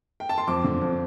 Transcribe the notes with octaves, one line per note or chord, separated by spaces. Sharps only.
G5
A5
C6
F2 D6
D3
F2